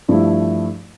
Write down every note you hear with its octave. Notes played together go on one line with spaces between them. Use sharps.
G2 F3 A3 E4